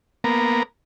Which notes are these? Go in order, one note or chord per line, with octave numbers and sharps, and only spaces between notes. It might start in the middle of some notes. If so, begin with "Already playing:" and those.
A#3 B3 A#4